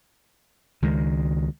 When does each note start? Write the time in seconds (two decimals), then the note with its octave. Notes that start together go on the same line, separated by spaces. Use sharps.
0.82 C#2 D#3 G#3